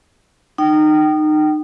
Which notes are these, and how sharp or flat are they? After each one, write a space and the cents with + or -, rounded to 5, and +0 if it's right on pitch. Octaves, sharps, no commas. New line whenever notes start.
D#4 -25 G5 -25